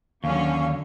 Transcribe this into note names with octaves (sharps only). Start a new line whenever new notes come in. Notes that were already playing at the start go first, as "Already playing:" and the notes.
D#2 D3 F#3 C#4 F5 C#6